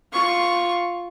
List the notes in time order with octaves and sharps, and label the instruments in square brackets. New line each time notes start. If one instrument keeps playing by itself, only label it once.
[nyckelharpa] F4 C#6